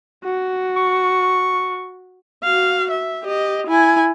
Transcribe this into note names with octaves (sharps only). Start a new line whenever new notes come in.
F#4
C#6
F#4 F5
E5
G4 D#5
E4 G#5